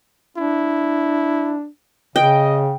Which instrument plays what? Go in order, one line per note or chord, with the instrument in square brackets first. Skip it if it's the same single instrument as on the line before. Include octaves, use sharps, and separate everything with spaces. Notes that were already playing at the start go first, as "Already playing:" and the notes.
[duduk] D4 [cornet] E4
[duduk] C#3 [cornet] D#5 [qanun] G5